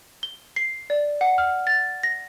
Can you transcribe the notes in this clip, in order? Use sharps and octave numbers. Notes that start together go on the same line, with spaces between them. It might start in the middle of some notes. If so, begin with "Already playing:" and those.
G7
C7
D5
F#5
F6
A6
A#6